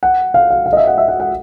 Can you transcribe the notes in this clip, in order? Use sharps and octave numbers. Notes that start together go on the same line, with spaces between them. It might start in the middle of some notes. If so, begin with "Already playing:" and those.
F#5
F5
F5
F5
D#5
E5
F#5
E5
F#5
F#5